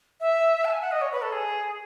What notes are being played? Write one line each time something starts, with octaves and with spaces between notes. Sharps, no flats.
E5
A5
G#5
F#5
D#5
C#5
B4
A4
G#4